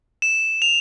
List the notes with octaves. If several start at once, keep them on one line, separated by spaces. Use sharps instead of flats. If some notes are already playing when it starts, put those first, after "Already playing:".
E7
F7